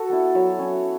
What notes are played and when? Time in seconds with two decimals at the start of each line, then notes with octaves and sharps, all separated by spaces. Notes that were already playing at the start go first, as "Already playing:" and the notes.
Already playing: F#4 A4
0.10 B3 E4
0.35 F#3 C#5 E5
0.59 C#4 E4